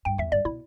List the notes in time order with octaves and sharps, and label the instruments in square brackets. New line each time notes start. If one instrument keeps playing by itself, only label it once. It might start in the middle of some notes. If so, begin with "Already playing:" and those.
[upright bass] G2 [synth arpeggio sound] G5
[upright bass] E2 [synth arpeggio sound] E5
[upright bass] G2 [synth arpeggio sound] D5
[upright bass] B2 [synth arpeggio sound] E4